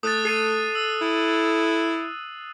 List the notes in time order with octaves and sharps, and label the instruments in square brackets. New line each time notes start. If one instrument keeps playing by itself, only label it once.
[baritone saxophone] A3 [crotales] D#6 F#6 A6
[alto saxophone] A4 [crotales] C7 D#7
[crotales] E6
[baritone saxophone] E4